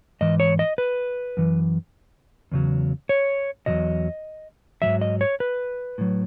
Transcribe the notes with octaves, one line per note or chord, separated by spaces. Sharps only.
G#2 E3 D#5
C#5
D#5
B4
F#2 E3
E2 C#3 F#3
C#5
E2 C#3 F#3 D#5
G#2 D#3 F#3 E5
D#5
C#5
B4
A2 F#3